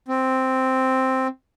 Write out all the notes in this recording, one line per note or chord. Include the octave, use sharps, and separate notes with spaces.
C4